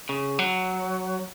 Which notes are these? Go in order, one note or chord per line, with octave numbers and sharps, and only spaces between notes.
C#3
F#3